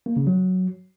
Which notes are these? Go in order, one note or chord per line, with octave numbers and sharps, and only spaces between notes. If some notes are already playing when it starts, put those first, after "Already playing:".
A#3
C#3
F#3